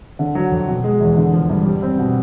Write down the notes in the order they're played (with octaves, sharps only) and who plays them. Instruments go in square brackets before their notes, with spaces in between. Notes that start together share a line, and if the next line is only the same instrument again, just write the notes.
[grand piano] D3
F#3
F2
B2
G#3
E2
D3
F3
G2
G3
C4
B2